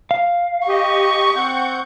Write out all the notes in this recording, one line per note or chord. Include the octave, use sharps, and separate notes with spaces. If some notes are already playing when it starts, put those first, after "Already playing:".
F5
G4 D#5 C#6
C4 F#5 G6